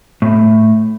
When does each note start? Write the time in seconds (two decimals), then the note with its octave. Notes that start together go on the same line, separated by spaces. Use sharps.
0.22 A2